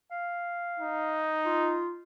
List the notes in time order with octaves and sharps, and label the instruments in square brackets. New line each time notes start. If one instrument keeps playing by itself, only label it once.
[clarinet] F5
[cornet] D#4
[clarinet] F4